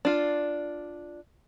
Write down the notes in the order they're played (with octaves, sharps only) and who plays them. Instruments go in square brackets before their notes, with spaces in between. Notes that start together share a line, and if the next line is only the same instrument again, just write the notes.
[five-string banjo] D4 F4